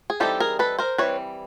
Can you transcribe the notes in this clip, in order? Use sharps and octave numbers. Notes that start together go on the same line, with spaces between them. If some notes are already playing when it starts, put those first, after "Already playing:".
G#4
E3 G3 C4 D#4 G4 A4
G#4 A#4
A4 B4
A#4 C5
E3 G3 C4 B4 C#5